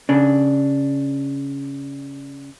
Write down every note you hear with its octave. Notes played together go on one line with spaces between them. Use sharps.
C#3 D4